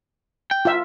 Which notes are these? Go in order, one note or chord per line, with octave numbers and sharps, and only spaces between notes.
G5
F4 E5